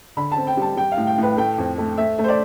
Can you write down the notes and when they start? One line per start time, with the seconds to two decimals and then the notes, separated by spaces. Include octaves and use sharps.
0.17 D3 B5
0.32 C4 A5
0.47 G5
0.57 G3 A5
0.77 G3 G5
0.92 F5
0.97 A2
1.07 G5
1.18 A2 B4
1.37 A3 G5
1.58 F2
1.78 A3
1.98 A3 E5
2.19 A3
2.24 C5
2.28 D5